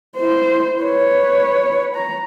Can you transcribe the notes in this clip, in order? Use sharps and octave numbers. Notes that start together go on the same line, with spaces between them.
E4 C5
B4 C#5
A#5